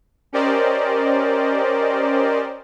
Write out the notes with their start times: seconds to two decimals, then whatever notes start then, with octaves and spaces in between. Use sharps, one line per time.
0.33 C#4 G4 A#4 C5 D5 D#5